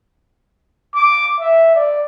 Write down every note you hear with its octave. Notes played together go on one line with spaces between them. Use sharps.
D6
E5
D5